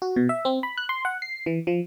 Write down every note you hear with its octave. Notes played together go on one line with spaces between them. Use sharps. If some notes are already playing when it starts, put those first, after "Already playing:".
F#4
B2
E5
C4
B5
F#6
C6
F#5
C7
E3
F3